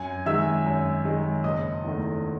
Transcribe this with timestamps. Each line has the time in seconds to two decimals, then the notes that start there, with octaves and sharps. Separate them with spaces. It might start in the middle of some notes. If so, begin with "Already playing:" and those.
Already playing: F#2 G#5 G#6
0.26 D#3 G#3 E5 E6
0.66 F#2
1.05 D#3 G#3
1.44 F#1 D#5 D#6
1.83 E2 D#3 A3